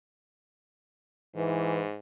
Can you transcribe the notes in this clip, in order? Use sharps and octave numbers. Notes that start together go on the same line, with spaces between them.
G#2 E3